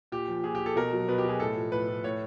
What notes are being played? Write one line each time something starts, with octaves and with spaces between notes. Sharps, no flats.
A#2 G4
F3
A#2 G#4
G4
F3
A4
B2 A#4
F#3
B2 B4
G4
F#3 G#4
A2 A4
F3
A2 B4
F3
A2 C#5